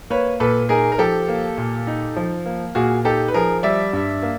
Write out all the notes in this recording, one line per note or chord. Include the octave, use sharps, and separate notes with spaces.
A#3 B4 C#5
A#2 A4 B4
D#4 G#4 A#4
A#4
F3 G4 A4
A#3
A#2
D#4
F3
A#3
A#2 F#4 G#4
D#4 G4 A4
B4
F3 G#4 A#4
G3 D5 E5
G2
A#3